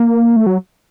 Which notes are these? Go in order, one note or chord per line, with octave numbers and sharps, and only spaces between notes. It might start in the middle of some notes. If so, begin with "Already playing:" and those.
Already playing: A#3
A3
F#3